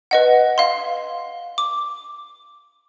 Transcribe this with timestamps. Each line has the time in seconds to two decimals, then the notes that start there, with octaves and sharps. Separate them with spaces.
0.11 B4 D#5 F#5
0.58 F5 C6
1.58 D6